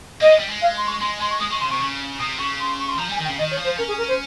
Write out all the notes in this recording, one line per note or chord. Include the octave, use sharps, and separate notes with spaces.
A#3 D#5
G#3
G3
G#3
F5
C6
C#6
G#3 C6
G#3 C6
C#6
G#3 D#6
G#3 C#6
C#3 C6
C3 C#6
C#3
C3 D#6
C#3 C#6
C6
C#6
C6
F3 A#5
G3 G#5
D#3
G5
C#3
D#3 D#5
C#5
F3
C5
C#4 A#4
G#4
A#4
C5